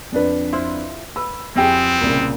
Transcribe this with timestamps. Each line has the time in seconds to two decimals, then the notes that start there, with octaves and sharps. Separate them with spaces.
0.12 F2 D4 B4
0.53 E4 F4 C5
1.16 B4 E6
1.56 F2 B3 C4 E4 G4 G#4
2.01 C2 A#2 C#3